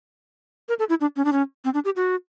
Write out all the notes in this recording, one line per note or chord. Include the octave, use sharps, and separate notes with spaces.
A#4
A4
E4
D4
C#4
D4
C#4
C4
D4
G4
F#4